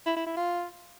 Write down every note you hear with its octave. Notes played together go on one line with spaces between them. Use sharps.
E4
E4
E4
F4